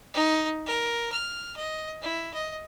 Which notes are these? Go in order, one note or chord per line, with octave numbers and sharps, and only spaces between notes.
D#4
A#4
F6
D#5
E4
D#5